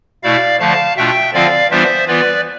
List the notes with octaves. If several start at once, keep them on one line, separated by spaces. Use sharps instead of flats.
B2 A3 E4 D5 F5
D3 F3 A3 F5 A5
B2 A3 D4 F4 E5 G5
D3 F3 C4 F4 D5 F5
E3 G3 B3 D4 F4 C5 E5
E3 B3 F4 B4 D5